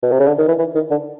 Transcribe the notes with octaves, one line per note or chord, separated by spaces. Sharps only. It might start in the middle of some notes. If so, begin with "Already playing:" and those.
B2
C3
C#3
D3
D#3
E3
E3
D#3
D3